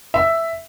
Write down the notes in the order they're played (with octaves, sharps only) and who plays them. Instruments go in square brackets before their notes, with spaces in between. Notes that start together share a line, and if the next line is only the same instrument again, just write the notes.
[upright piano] E5